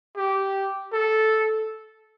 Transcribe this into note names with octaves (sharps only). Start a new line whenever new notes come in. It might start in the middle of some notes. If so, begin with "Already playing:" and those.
G4
A4